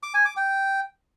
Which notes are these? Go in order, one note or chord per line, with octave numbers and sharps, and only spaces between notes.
D6
G#5
D6
G5